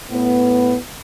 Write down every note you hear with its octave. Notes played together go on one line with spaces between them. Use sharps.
A2 B3